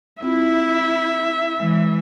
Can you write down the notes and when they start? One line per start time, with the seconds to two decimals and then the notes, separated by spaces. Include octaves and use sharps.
0.23 C4 E4 F4 E5
1.60 E3 G#3